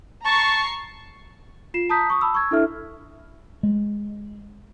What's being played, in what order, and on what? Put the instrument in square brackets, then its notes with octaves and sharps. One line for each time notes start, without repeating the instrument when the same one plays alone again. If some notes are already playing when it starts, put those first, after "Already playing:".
[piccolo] A5 [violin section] A#5 C#6 C7
[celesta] F4 C7 E7
A5 A#5 D#6 G6 B6
C#6 D#6
A5 B5 E6
C#6 E6 G#6
D4 E4 A4 E5 F6
[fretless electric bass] G#3